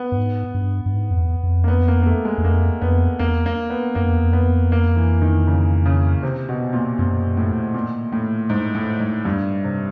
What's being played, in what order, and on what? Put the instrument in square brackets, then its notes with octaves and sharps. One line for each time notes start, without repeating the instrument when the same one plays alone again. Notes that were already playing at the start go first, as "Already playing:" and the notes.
Already playing: [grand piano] B3
[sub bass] G2
G#2
G2
G2
G#2
F2
E2
F2
[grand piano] A#3
B3
A#3
A#3
A3
G#3
[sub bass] E2
[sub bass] F2 [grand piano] A#3
[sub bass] F2 [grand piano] B3
[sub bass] E2 [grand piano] A#3
[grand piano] A#3
B3
[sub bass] F#2 [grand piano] A#3
[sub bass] F2
E2
F2
[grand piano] B3
A#3
E3
D#3
C#3
C#3
C3
B2
A#2
[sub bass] F#2 [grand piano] A#2
[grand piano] A2
A#2
A2
G#2
A2
G#2
G2
C3